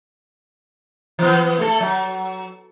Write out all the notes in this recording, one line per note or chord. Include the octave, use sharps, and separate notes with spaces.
E3 B3
A3 A4
F#3